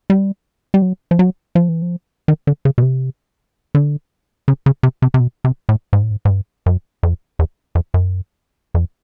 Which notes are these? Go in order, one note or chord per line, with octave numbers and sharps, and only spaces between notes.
G3
G3
F#3
F3
F#3
F3
E3
F3
D#3
D3
C#3
B2
C3
D3
C#3
C#3
C3
C3
C3
B2
C3
A2
G#2
A2
G#2
G#2
G2
F#2
F2
E2
F2
F#2
F2